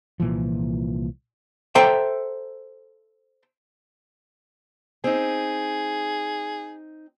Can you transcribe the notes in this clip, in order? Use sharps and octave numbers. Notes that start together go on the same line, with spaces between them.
C2 A#2 E3 F3
A4 C5 E5 G5 A#5
C4 D#4 G#4